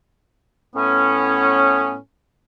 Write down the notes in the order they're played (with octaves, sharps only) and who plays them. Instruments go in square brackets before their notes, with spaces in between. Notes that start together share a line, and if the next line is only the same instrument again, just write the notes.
[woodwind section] A2 B3 C#4